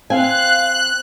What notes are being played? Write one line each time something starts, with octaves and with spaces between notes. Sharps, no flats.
C4 F5 G#5 F#6